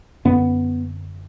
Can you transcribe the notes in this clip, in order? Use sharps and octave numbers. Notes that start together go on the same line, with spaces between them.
F#2 D3 B3